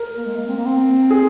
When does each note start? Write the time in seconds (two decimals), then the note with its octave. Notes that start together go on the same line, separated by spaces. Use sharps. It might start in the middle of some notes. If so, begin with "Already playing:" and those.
Already playing: A#4
0.17 A#3
0.26 G#3
0.36 A#3
0.48 C4
0.56 A#3
0.66 C4
1.11 G#4